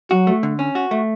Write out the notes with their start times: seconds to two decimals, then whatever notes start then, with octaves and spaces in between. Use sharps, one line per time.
0.11 F#3 F#4
0.27 A3
0.43 D3
0.59 C#4
0.75 F#4
0.91 A3